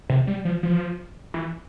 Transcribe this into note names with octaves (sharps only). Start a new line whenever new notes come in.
C3
G3
F3
F3
E3